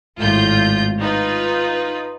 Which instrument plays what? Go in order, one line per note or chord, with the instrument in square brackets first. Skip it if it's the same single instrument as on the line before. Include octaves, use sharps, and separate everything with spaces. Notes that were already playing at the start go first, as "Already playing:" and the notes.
[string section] G#1 A2 F4 G6
D#4 F4 B4